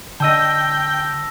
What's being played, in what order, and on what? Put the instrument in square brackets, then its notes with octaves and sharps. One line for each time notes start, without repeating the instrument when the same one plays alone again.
[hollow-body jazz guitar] D3 D#5 [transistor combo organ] G5 [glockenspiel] A5 E6 A#6